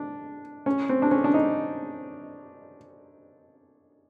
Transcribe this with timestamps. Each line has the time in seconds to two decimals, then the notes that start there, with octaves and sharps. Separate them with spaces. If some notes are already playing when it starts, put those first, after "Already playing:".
Already playing: D4
0.66 C#4
0.89 C4
1.02 D4
1.11 C#4
1.24 D4
1.34 D#4